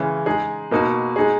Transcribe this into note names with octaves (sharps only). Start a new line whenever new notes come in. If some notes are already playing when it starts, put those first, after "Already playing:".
Already playing: C#3 E3 G#3 C#4
G#3 D#4 G#4
B2 A#3 D#4 F#4
G#3 D#4 G#4